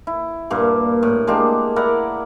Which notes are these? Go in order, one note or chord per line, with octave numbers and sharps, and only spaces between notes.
E4
G2 A#2 A#3
A2
G#3 A#3 D4 G4
E4 A#4 D5 F#5